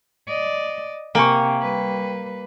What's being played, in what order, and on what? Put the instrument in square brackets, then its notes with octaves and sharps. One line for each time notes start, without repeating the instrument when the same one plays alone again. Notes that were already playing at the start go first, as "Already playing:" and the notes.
[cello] D5 D#5
[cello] C3 [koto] A#3 [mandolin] G5 G#5 C#6
[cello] G3 B4